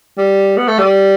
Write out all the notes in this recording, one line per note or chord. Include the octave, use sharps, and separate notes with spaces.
G3
B3
A3
G3